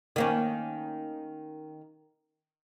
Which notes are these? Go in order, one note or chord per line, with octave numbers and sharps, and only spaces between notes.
D#3 A#3 C#4